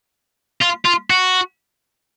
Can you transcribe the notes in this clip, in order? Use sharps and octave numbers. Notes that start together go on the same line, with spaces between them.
F4
F4
F#4